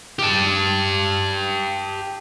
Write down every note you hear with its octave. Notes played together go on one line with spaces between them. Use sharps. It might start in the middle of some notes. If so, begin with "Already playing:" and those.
G4 A5